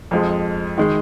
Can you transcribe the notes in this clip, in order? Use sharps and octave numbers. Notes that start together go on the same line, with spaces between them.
F2 F3 G#3
D#3 G#3